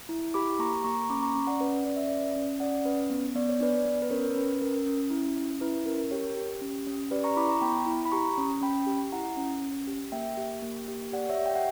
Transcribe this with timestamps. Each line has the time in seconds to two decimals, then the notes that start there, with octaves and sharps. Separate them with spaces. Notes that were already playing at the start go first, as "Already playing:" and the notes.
0.09 E4
0.34 G4 B5 D6
0.59 A#3 A#5 C#6
0.84 A#3 A#5 C#6
1.10 C#4 B5 D6
1.23 A#5 C#6
1.35 C#4
1.47 D5 F#5
1.60 C#4 B4
1.85 C#4 D5
1.96 E5
2.07 C#4 B4 D5
2.36 C#4
2.60 C#4 D5 F#5
2.85 C#4 B4
3.10 B3
3.35 B3 D5
3.49 C#5
3.60 D4 B4 D5
3.85 B3
4.02 B4
4.10 C#4 A#4 C#5
4.36 C#4 B4
4.61 C#4 A#4
4.86 C#4
5.10 E4
5.36 C#4
5.61 E4 B4
5.86 C#4 A#4
6.11 G4 A#4 C#5
6.37 G4
6.62 C#4
6.87 C#4
7.11 G4 B4 D5
7.24 A#5 C#6
7.37 E4 B5 D6
7.49 A#5 C#6
7.61 B3 G5 B5
7.86 E4
8.05 B5
8.12 G4 A#5 C#6
8.38 C#4
8.61 C#4 G5 B5
8.87 G4
9.12 E4 F#5 A#5
9.37 C#4
9.62 C#4
9.87 G4
10.12 A#3 E5 G5
10.37 G4
10.62 A#3
10.88 G4
11.12 G4 D5 F#5
11.29 C#5 E5
11.38 G4
11.46 G5
11.56 F#5